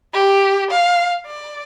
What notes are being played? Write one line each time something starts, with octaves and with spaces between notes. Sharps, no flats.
G4
F5
D5